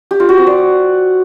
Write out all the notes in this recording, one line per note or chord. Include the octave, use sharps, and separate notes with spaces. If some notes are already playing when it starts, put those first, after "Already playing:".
G4
F4
F#4
C4
D5